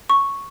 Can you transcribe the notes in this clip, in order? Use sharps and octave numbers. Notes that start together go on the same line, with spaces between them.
C#6